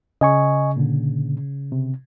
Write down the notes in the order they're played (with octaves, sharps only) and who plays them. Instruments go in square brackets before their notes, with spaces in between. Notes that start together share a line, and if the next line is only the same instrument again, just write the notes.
[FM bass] C#3 [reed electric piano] D#5 G#5 C#6
[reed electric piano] A#2 D3
C3